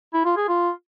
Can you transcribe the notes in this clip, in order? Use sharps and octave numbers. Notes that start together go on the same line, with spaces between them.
E4
F4
G#4
F4